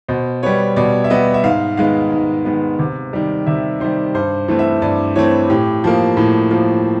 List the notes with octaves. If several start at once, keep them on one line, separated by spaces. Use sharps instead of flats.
B2 C5
G3 B3 C#5
B2 D5
E5
G3 B3 D#5
E5
G#2 F5
D#3 G#3 B3 F5
G#2
D#3 G#3 B3
C3
D#3 G3
C3 E5
D#3 G3 C5
G2 C5
E3 A3 C4
E5
G2 D5
E3 A3 C4 C#5
A2 G4
F3 A#3
A2
F3 A#3